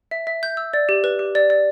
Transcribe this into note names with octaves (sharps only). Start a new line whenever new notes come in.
E5
E5
G6
E6
D5
G4
B4
G4
D5
D5